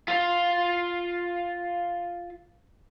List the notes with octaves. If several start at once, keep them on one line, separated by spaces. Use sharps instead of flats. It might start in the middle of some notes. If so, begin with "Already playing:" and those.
F4 F5